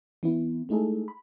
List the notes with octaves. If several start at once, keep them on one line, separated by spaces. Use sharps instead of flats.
E3 B3 C4 E4
G#3 A3 D#4 E4 G#4 A4
B5